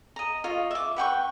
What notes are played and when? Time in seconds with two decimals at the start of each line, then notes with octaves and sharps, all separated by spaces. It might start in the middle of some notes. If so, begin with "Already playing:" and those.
0.16 D#5 A#5
0.44 F4 C#5 D#5
0.71 E5 D6
0.96 B4 F#5 G5 C#6